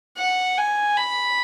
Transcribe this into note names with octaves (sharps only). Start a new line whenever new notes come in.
F#5
G#5
B5